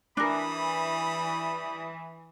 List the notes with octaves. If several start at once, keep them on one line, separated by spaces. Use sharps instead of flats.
E3 G3 D4 A#4 B5 D#6